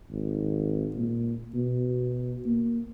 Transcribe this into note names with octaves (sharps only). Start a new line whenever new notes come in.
G#1
A#2
B2
A#3